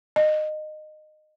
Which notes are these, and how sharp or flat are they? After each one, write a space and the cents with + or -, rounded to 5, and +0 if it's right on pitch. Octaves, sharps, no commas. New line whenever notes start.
D#5 -20